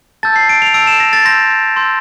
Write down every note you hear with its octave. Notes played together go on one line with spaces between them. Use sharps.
A5 E6 G6 A6
C7
D7
F7
A5 E6 G6 D7
E7
A#6
A6
C6 E6 G6 A#6
C6 E6 G6